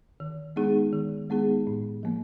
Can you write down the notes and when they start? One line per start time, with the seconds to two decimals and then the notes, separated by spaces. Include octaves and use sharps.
0.20 D#3
0.56 G#3 B3 D#4 G#4
0.93 D#3
1.30 G#3 B3 D#4 G#4
1.67 A2
2.03 F3 A#3